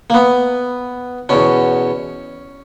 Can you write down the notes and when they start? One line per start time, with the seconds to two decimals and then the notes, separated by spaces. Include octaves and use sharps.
0.10 A#3
0.14 B3
1.29 E2 B2 C#4